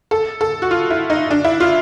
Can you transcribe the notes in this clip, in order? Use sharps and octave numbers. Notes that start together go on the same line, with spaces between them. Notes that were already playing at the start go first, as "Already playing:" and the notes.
A4
A4
F#4
F4
E4
D#4
D4
E4
F4